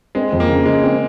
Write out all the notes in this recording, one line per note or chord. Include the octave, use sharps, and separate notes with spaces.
G#3 C4
F2
A#3
C#3
C#3 G#3
C4